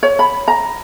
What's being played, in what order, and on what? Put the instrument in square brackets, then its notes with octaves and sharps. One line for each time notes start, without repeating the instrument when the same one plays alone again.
[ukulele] C#5
B5
A#5